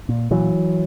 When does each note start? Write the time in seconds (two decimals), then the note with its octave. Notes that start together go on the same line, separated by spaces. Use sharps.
0.09 A#2
0.31 A#2 E3 F#3